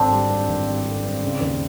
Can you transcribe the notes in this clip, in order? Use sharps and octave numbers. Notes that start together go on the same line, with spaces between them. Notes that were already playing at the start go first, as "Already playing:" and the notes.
Already playing: G#1 D3 C4 D4
G3
G2
G#1
G3
D3
G2
C#3
D#2